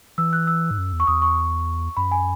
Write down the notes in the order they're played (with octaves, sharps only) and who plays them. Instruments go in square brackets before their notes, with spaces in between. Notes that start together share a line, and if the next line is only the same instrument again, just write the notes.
[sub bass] E3 [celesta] E6
[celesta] F#6
E6
[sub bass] G#2
F#2
E2
[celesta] C#6
[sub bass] E2 [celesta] D#6
[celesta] C#6
[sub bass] F#2 [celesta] B5
[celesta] G#5